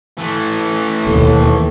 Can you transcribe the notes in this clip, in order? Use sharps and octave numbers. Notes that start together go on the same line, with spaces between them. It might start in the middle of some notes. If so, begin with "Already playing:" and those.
E3 A3
E1 D#2 B2 A4